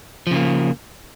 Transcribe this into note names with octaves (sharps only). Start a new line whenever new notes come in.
C#3 F3 A#3